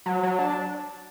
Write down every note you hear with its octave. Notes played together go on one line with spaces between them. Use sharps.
F#3
F#3
D4